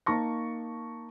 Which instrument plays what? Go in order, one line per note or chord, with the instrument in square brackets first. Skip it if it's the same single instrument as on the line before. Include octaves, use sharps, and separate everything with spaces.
[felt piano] A#3 D#4 A5 C#6 A#6